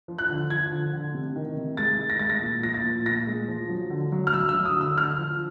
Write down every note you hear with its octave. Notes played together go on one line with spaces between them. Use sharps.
F3
F#6
D3
F3 G#6
D3
D3
C3
D#3
C3
G#3 A6
D#3
A#6
G#3 A6
A#6
A#2
F3 A#6
A6
A#2
A#2 A#6
G#3
F3
F#3
D3
F#3
F6
F#3 E6
E6
F#3
D#6
D3 E6
D3 F6
F3